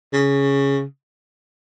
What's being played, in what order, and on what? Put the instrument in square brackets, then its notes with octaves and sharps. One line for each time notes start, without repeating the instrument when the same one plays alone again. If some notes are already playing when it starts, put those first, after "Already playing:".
[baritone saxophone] C#3